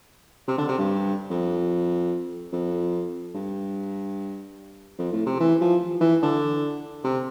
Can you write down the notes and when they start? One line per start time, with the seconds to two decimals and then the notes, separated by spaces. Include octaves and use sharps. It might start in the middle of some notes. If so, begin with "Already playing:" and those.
0.48 C3
0.58 D3
0.69 C3
0.78 G2
1.30 F2
2.53 F2
3.35 G2
4.99 F2
5.13 A2
5.26 C3
5.40 E3
5.61 F3
6.01 E3
6.22 D3
7.04 C3